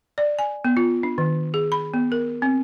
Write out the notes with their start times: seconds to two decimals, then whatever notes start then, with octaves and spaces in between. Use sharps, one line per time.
0.18 D5
0.39 G#5
0.65 B3
0.77 F4
1.03 D4
1.18 D#3
1.54 G#4
1.72 B5
1.94 B3
2.12 A#4
2.42 C4